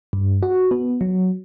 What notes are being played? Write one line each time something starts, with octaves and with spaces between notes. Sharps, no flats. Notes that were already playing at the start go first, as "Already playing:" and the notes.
G2
F#4
B3
F#3